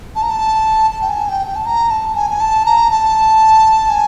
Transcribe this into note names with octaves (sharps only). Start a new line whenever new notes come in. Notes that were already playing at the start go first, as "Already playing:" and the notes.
A5
A#5
A5
A5
G5
G#5
G5
G5
A5
A#5
A5
G#5
G#5
A5
A#5
A5
G#5